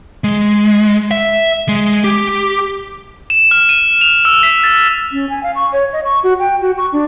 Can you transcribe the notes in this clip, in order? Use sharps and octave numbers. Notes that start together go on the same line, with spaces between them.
G#3
E5
G#3
G4
E7
F6
D#7
F7
E6
B6
A6
C#4
G#5
F5
C#6
C#5
D#5
C#6
F#4
G5
F#4
C#6
D4